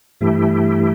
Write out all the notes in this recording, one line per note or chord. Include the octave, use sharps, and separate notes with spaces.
G2 E3 A3 E4 G4